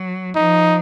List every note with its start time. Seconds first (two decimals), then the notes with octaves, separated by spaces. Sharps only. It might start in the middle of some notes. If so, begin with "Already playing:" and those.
Already playing: F#3
0.35 F3 D#4